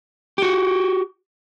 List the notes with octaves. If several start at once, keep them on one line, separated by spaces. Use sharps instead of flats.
F#4 G4